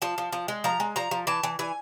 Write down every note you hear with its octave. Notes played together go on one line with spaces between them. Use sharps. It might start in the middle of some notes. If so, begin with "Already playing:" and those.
F3 A5
F3
F3
G#3
F3 A#5
G#3
F3 A#5
F3
E3 A5
E3
E3 G#5